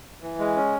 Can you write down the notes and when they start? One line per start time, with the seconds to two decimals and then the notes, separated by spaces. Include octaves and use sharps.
0.22 E3
0.39 G#3
0.56 C#4